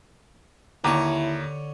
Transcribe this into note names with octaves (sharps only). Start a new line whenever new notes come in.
D#2 D3 E4 C#5 A#5 D6